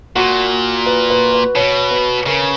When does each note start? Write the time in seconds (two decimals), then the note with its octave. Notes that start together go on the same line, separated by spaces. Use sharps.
0.16 A#2 F#4
0.86 B4
1.10 B4
1.33 B4
1.56 B2 C#5
1.91 B4
2.26 C#3 A#4